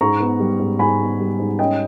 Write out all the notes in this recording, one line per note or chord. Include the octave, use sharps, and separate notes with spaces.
G#2 A#5 C#6
B3
G3
G#2
G#2 G#5 B5
B3
G3
G#2
C#4 D#5 G5